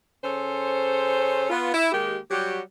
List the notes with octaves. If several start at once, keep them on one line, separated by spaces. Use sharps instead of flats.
C#3 C#4 A4 C5
B3 F4
E4
D#3 G#3 A#3 G4
F#3 G3 F#4 G4